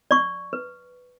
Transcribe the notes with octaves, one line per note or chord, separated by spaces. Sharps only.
D5 C#6
B4